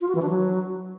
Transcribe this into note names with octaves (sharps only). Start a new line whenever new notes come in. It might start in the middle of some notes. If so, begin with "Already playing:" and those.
F4
F#4
E3
D4
F#3